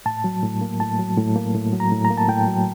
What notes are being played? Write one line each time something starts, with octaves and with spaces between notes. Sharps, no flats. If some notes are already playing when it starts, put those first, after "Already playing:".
A2 A5
F#3
A2
A#3
A2 A5
F#3
A2
A#3
A2
F#3
A#5
A2
A#5
A#3
A5
A2 G5
F#3